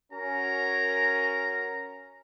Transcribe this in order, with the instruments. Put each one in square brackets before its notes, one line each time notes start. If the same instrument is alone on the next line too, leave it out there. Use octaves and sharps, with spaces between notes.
[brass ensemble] C#4 F#4 A#4 [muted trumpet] A#5